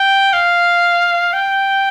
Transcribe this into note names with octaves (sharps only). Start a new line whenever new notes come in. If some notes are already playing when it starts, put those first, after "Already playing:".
Already playing: G5
F5
G5